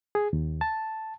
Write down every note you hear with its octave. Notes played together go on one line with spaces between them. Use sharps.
G#4
D#2
A5